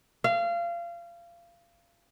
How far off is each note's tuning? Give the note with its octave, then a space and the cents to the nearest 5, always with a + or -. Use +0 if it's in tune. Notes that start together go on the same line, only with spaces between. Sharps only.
F5 -25